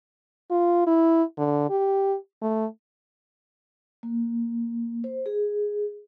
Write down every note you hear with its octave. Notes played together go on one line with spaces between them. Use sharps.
F4
E4
D3
G4
A3
A#3
C5
G#4